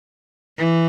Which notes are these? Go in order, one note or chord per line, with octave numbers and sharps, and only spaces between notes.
E3